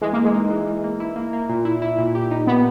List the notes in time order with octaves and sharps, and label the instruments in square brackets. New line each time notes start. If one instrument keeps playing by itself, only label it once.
[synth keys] E3 [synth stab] G#3
[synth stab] A#3
[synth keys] E3
[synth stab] G#3
[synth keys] D#4
E3
E3
A#3
E4
A#3
A#3
A#2
E4
E4
A#2
G4
D#4
[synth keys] A#2 [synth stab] B3